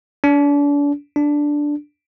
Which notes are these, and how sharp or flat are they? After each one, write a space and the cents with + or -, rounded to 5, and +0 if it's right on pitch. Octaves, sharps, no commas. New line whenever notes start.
D4 -35
D4 +0